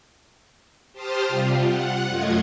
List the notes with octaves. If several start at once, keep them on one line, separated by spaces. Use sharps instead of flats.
G4 C5 A5 C6 D#6 F6
C3 G3 F4
F#5
F#2 A3 F4 D#5 G#6